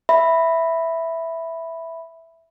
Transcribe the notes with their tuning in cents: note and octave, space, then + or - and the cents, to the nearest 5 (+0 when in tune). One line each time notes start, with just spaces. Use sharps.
E5 +0 B5 +0